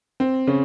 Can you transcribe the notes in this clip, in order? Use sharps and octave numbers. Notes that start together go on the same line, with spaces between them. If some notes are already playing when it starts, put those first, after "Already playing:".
C4
C#3 C#4